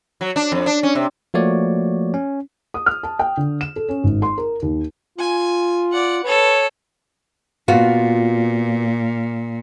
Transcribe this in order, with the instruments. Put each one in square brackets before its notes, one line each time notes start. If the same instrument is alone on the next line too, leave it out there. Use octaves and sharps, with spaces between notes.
[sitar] F#3
D4
F2
D4
C#4
C3
[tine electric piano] F3 A3 A#3 F#4 C#5 D5
C#4
[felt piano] D#6
F6
A5
G5
D3
E7
A4
C#4
G#1
C6
A#4
D#2
[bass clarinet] F4 [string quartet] G#5
[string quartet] D5 F#5
[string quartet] A4 C#5 [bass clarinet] B4
[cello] A#2 [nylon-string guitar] B3 F4 F#4